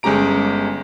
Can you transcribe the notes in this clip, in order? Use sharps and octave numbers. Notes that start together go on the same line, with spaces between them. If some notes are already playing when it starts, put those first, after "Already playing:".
G1 G#3 C#4 G4 A#5 D7